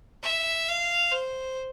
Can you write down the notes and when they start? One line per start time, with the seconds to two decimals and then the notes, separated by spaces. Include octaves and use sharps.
0.23 E5
0.68 F5
1.12 C5